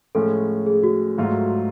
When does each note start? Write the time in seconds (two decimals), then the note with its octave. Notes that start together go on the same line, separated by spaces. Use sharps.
0.15 A2 F3 G#3 C#4 A4
0.66 G#4
0.83 F#4
1.18 G#2 F#3 A3 F4